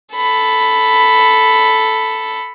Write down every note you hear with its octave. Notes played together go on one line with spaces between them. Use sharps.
A4 B5